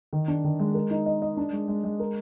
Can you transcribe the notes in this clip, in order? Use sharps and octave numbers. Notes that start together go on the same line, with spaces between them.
D#3
D4
D#3
G#3
A#4
D#4
D#5
D#5
D4
G#3
G#3
G#3
A#4